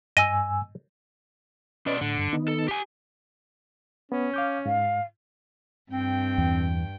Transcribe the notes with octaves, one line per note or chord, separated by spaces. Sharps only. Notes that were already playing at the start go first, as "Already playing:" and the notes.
G2 D#5 G#5 E6
B2 C#4 B4 D5 D#5
A2 D3
G2
D#3 B3 D#4
A4
G4 G#5
B3 C#4
F5 D6 G6
G#2 F5
G2 C4 G5
E2